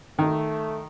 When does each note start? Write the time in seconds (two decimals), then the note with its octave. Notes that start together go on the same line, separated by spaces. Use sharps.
0.19 D#3 A3